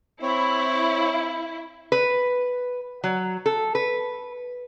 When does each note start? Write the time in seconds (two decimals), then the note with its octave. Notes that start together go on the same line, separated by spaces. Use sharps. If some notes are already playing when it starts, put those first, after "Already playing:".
0.22 C4 E4 C#5
1.92 B4
3.04 F#3
3.46 A4
3.75 B4